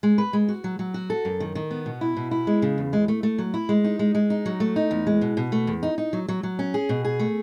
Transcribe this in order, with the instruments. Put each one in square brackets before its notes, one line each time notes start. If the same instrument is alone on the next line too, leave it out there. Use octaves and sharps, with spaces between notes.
[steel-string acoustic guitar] G#3
B4
G#3
F#4
F#3
F#3
F#4
A4
F#2
D#3
D#3
B3
B2
E4
B2
E4
G#3
C#3
E2
G#3
A3
A3
F#3
E4
G#3
D#4
G#3
G#3
D#4
F#3
A3
D#4
E2
G#3
B2
B2
A3
E2
D#4
D#4
F#3
F#3
F#3
C#4
G#4
B2
G#4
A3